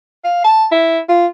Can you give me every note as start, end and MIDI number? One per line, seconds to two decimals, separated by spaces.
0.25 0.41 77
0.45 0.67 81
0.72 0.99 64
1.09 1.27 65